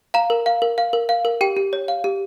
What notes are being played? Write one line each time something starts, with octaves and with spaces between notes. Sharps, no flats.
F5 A#5
A#4
F5
A#4
F5
A#4
F5
A#4
G4 G5
G4
C#5
F5
G4